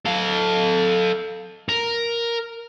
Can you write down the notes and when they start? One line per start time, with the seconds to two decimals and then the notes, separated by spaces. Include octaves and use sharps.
0.06 A4 F5
1.69 A#4